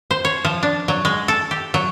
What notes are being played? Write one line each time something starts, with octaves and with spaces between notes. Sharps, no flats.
C5
C#5
F3
D4
F#3
G#3
A4
G4
F#3